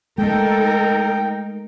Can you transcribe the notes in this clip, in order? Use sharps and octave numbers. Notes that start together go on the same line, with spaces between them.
G#3 A3 D#4 A4 A#4 G5